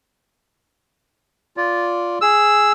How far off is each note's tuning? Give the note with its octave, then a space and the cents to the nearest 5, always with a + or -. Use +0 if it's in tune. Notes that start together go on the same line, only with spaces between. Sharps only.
F4 +0 D5 -15
G#4 +0 E6 +0